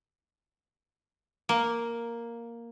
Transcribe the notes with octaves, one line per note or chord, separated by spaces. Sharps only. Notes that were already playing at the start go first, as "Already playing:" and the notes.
A#3